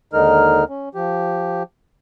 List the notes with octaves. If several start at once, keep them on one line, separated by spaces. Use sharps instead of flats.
D#2 D3 G#3 D#4 A#4 F6
C#4
F3 G4